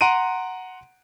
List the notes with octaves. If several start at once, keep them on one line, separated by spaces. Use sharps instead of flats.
F#5 A#5 C6 D7 D#7